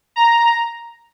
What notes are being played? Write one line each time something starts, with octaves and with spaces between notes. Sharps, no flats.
A#5